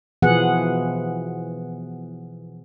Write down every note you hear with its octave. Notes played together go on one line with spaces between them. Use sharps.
B2 E3 F3 B3 G#4 F#5